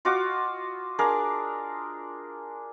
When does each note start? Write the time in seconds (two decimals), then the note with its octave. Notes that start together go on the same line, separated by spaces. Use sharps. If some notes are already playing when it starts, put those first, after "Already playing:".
0.05 F4 F#4 D#5 D6
0.99 D4 G#4 A#4 F5